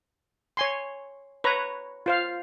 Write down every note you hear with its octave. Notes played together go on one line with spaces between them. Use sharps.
C#5 G#5 C6
B4 C#5 A#5
F4 C5 F5